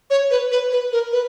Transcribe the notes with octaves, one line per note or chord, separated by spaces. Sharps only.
C#5
B4
B4
B4
A#4
B4